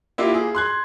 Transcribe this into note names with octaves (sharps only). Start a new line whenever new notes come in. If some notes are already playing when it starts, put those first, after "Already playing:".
A#3 E4 F4 G4
G#4
C6 F#6 G#6